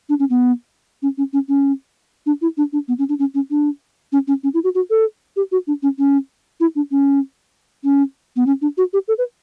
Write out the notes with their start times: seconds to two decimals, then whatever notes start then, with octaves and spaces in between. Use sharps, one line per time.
0.09 D4
0.19 C#4
0.30 B3
1.02 C#4
1.18 C#4
1.33 C#4
1.48 C#4
2.26 D4
2.42 E4
2.57 D4
2.73 D4
2.88 B3
2.99 C#4
3.09 D4
3.19 C#4
3.35 C#4
3.50 D4
4.12 C#4
4.28 C#4
4.43 C#4
4.54 E4
4.64 F#4
4.75 F#4
4.90 A4
5.36 G4
5.52 F#4
5.67 D4
5.83 C#4
5.98 C#4
6.60 E4
6.76 D4
6.91 C#4
7.84 C#4
8.36 B3
8.46 C#4
8.62 D4
8.78 F#4
8.93 G4
9.08 A4
9.18 B4